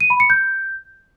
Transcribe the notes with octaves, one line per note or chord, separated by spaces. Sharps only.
D#7
B5
C#7
G6